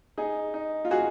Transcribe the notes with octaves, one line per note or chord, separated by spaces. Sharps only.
D#4 G#4
D#4
F4
F#4 G#4